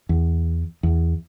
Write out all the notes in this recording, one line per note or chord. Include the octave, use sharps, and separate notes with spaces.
E2
E2